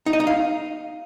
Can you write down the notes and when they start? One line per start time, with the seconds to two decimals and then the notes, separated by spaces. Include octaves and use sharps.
0.06 D#4
0.13 D#5
0.20 D#4
0.27 F5